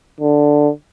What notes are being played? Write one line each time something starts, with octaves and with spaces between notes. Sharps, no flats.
D3